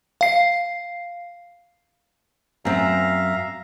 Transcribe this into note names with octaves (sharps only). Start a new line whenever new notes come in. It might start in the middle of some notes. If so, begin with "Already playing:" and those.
F5 C7
F#2 C4 E5 F5 A#5